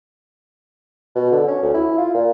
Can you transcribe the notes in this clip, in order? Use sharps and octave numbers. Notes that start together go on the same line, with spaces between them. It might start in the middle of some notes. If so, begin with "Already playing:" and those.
B2
D3
C#4
D2
E4
F4
A#2